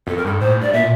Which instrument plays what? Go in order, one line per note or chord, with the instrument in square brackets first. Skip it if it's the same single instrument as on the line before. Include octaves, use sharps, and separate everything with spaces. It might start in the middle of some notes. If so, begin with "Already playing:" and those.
[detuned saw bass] F2 [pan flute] A4
[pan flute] A#4
[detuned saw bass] G2 [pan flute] A4
[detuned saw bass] A2 [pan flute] C5
[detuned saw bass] G2
[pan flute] D5
[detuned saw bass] A#2 [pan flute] E5